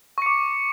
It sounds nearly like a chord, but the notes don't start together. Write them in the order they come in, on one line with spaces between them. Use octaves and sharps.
C#6 C#7 D6